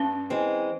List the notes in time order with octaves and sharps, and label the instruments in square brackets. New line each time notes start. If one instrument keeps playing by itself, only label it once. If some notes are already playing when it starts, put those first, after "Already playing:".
Already playing: [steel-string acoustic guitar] G2 [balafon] C#4
[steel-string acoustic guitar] E3 G#3 C4